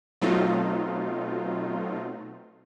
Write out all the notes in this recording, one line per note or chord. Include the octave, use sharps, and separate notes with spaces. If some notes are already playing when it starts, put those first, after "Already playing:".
B2 F#3 A3 C4 D#4 F4